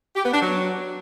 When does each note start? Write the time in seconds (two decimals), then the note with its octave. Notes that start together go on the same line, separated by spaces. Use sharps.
0.16 G4
0.25 B3
0.33 D4
0.42 F#3